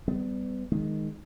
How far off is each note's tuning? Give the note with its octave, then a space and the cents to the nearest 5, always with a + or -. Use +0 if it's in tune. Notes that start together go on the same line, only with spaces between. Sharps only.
G3 +0 B3 +35
D#3 +0 G#3 +0